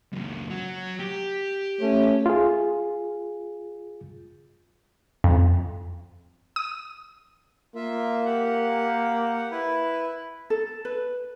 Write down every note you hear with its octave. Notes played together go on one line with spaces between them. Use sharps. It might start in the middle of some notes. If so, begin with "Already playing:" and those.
C#2 F#2
F#3 F#4
G4
A3 C#4
F4 G#4
F2
D#6
A#3 F4 E5
G4 F#5
E4 B4
A4
B4